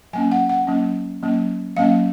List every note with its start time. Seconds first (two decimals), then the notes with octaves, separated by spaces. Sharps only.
0.13 F#3 A#3 C#4 G#5
0.32 F#5
0.49 F#5
0.67 F#3 A#3 C#4
1.23 F#3 A#3 C#4
1.77 F#3 A#3 C#4 F5